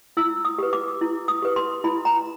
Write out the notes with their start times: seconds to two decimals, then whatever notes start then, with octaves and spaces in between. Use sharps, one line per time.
0.17 E4 E6
0.45 D#6
0.58 G4 B4
0.73 D6
1.01 E4
1.28 D#6
1.42 G4 B4
1.56 C6
1.84 E4 B5
2.05 A#5